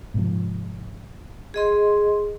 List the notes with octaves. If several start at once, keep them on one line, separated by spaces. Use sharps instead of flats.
G#2 C3 F3
G#4 D#5 C6